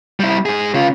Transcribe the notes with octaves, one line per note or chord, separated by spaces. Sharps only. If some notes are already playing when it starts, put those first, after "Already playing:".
G3 E4
G#2 G#4
C#3 F4